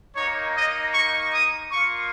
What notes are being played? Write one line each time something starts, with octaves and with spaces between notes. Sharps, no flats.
A#3 D#4 C#5
D#5
C#6
D#6
A#3 F4 C#6